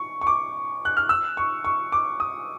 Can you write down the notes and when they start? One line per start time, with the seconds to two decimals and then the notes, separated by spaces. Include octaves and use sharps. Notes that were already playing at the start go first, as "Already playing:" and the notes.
Already playing: C#6
0.21 C#6
0.27 D6
0.85 F#6
0.97 F6
1.09 E6
1.37 C#6
1.64 C#6
1.92 D6
2.20 D#6